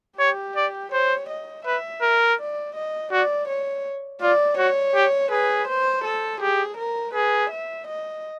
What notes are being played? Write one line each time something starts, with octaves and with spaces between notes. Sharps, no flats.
G4 C#5
D5
C5 C#5
D#5
B4 E5
A#4
D5
D#5
F#4 D5
C#5
F4 D5
F#4 C#5
G4
G#4 B4
C5
A4
G4 G#4
A#4
G#4 B4
E5
D#5